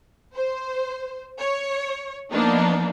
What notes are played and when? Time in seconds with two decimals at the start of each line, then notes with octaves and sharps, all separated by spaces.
0.34 C5
1.38 C#5
2.31 F3 A#3 B3 D4 D#4